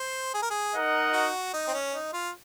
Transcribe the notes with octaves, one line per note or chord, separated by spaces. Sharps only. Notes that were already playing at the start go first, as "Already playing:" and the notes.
Already playing: C5
G#4
A#4
G#4
D#4 A#4 D#5 F#5
F#4
D#4
C4
C#4
D#4
F4